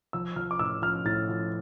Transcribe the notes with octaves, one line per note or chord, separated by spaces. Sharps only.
F3 E6
F3 F6
D6
A2 E6
F3 F6
A2 A6
F3